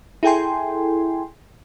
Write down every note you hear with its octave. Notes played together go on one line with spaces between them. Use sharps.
E4 G#4 A4 G5 G#5 C6